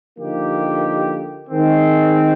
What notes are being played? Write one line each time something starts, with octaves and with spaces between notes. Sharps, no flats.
D3 F3 A#3 D#4 G4
D#3 G#3 C4